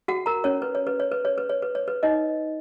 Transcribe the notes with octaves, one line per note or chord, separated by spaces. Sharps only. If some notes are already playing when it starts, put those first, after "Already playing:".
F#4 F#5
A#4 A#5
C#4 C#5
B4
C#5
B4
C#5
B4
C#5
B4
C#5
B4
C#5
B4
D#4 D#5